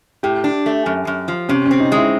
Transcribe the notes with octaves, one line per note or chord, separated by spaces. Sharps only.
A2 G4
D4
A3
F#2
F#2
F3
C3 C#4
C#4
C4
D#4
G#3 E4